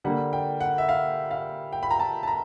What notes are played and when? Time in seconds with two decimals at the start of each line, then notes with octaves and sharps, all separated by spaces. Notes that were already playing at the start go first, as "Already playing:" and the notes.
0.04 D3 G3 A#3 F#5
0.33 G5
0.60 F#5
0.78 E5
0.89 F5
1.31 F5
1.73 G5
1.83 B5
1.91 A#5
1.99 A5
2.23 A5
2.27 A#5